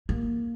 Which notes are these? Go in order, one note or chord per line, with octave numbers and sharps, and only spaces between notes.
A#3